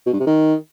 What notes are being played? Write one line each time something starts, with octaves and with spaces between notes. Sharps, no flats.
B2
G2
C3
D#3